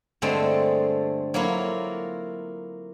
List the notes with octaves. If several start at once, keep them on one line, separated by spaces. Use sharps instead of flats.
G2 D3 G#3 A3 C4
F#3 A#3 E4 F4